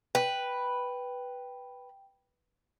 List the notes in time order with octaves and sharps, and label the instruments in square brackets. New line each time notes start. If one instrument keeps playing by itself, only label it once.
[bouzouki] B4 [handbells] G5